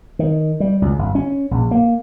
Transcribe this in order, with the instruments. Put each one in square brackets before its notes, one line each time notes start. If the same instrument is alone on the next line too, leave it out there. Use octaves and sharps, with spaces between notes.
[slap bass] D#3
G3
C#2
G1
C#4
A#1
A#3